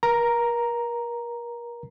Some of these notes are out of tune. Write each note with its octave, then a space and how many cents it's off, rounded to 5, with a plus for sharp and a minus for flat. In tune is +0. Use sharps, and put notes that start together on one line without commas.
A#4 +35 A#5 +0